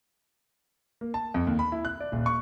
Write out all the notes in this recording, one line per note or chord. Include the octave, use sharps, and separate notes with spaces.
A#3
A5
F2
D#2
B5
E4
F#6
D5
D#1
C#6